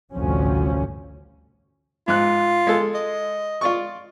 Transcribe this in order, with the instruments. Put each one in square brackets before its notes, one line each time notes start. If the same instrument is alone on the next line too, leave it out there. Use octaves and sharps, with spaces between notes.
[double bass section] A1 D2 G2 C3 F3 C#4
[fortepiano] G#2 F#6 [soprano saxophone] F4
[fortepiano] G#3 A4
[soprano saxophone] D#5
[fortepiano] F4 D5 C#6